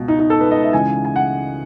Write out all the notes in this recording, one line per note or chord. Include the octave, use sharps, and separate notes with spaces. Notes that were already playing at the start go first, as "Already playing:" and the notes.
Already playing: C#2 B2
D#4
D#4
A4
B4
D#5
E5
C#2 C#3 E3 G#5
G#5
F#5